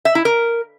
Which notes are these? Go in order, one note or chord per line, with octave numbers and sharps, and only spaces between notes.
E5
E4
A#4